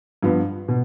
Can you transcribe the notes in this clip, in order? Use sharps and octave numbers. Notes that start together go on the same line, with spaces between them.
G2 F3 B3
B2